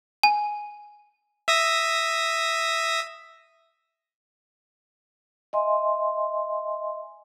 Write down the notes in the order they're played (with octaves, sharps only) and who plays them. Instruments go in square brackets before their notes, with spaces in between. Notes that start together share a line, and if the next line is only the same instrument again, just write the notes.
[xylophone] G#5
[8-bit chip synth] E5 D#6 A#6
[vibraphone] D#5 E5 G#5 C6